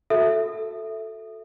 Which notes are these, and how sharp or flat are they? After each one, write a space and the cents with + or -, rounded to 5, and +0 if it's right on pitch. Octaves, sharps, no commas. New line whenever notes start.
F#4 -20 A4 +0 E5 +0